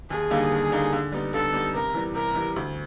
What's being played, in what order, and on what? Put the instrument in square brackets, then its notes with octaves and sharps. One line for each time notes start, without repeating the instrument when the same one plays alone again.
[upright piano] D#2 [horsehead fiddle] G#4
[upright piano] D3 G3 A#3 D#4
D#2
D3 G3 A#3 D#4
D3
G3 B3 D#4
[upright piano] D3 [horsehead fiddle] A4
[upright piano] G3 B3 D#4
[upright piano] C3 [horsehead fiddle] A#4
[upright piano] E3 G3
[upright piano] C3 [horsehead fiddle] A#4
[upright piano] E3 G3
D2